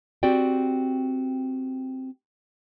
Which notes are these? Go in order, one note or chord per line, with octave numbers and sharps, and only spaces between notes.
C4 F#4 G4 D5 G5